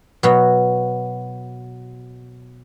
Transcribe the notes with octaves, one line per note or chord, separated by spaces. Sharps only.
B2 F#3